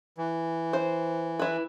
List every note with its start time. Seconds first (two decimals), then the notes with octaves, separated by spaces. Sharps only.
0.18 E3
0.73 C5
1.39 E4 B4